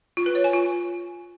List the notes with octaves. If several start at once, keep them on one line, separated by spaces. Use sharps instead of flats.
F4
B4
C#5
G#5
F4